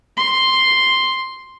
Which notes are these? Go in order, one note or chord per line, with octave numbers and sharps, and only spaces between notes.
C6